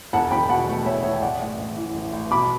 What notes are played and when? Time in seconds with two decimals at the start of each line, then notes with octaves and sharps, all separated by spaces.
0.13 E1 F#5 A5
0.31 E1 G5 B5
0.49 B2 F#5 A5
0.67 A3
0.86 E2 C#5 E5
1.04 E1 C#5 E5
1.14 G5
1.22 A1 D5 F#5
1.40 A1
1.58 A1
1.76 E3
1.95 A1
2.13 A1
2.31 B2 B5 D6